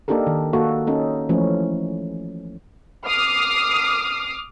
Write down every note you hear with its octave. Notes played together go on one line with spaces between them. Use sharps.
A#3 D4 D#4 G4 A4 A#4
D#3
A#3 F#4 A4
C#4 D#4 A4
E3 F3 A3 C#4
D6 D#6 F6 C7